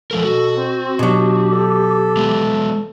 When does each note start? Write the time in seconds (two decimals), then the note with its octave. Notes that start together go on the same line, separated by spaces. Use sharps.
0.11 F3 G#3 A4 A#4
0.25 B2 F#4
0.56 C4
0.99 B2 F#3 D4 G4
1.52 A4
2.17 G#3 B3